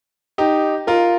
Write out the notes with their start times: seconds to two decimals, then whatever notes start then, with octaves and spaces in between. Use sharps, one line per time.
0.38 D#4 G4
0.87 F4 A#4